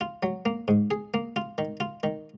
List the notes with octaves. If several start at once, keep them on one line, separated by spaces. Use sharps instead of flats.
F4
F#3
A#3
G#2
G#4
A#3
F4
D#3
F4
D#3